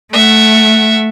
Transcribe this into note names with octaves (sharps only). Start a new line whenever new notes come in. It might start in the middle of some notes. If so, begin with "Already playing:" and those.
A3 E5 F#5